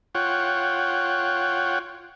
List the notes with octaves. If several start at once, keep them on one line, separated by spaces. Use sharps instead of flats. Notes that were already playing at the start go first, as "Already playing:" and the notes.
F4 C#5 F#5 G5